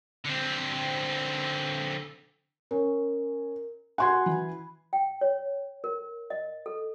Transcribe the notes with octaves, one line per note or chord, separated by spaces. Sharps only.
D3 C4
C#4 A#4
F#4 F#5 G#5 C6 G#6
E3 B5
G5
C#5
A#4
D#5
A4